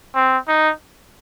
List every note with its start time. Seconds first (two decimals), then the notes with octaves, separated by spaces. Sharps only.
0.15 C4
0.48 D#4